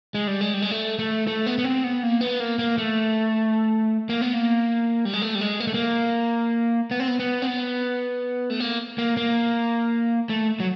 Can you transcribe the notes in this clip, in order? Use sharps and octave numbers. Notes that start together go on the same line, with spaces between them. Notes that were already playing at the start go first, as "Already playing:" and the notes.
G#3
G3
G#3
G3
G#3
A3
A3
A3
B3
B3
C4
B3
A#3
B3
A#3
A#3
A3
A#3
B3
A#3
G3
G#3
A3
G3
G#3
A#3
A3
A#3
B3
C4
B3
B3
C4
B3
A3
A#3
A#3
A#3
A3
F#3